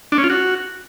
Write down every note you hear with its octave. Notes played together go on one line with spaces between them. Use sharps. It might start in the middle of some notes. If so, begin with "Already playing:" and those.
D4
C#4
F4
F#4